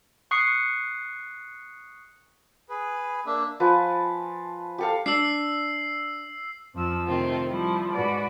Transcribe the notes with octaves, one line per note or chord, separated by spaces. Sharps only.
C#6 D#6 F#6 C7 C#7
G#4 B4
A#3 D4 E5
F3 B4 G#5 A5
G4 A4 F5
D4 E6 C7
F2 F3 E6
C3 D#3 A3 C4 F4
F3 G3 E4
G#2 F#4 B4 D5 B5